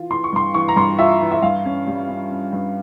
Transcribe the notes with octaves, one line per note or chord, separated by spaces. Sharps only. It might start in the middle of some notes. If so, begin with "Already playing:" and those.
Already playing: E3 F4
E3 C6
C#6
G2 C6
E3 C#6
A#5
G2 C6
F4 E5
E3
E5
G2 F5
C#4
G3
C#4
C#4
G2